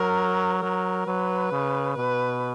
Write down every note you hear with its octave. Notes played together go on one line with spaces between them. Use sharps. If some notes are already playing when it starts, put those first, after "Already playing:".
Already playing: F#3 A#4
F#3 A#4
F#3 B4
C#3
B2 B4